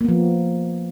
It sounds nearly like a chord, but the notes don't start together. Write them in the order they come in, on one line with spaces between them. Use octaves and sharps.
A#3 B3 F3